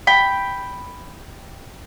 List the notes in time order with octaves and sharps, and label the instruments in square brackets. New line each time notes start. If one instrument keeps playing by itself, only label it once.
[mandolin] G5 B5